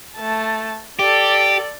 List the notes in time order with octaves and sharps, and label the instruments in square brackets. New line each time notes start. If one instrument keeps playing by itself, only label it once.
[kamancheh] A3 A5
[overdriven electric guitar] G4 [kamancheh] A4 D5